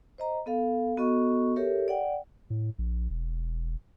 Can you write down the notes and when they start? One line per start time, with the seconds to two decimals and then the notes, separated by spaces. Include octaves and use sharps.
0.18 C5 D#5 A#5
0.46 B3 A4 F5
0.97 B3 F#4 A4 D#5 C#6
1.56 G4 A4 A#4 C#5 E5
1.88 D5 F#5 G5
2.50 A2
2.79 A#1
3.10 E1